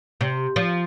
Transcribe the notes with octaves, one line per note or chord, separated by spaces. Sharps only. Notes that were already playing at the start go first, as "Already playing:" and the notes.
C3
F3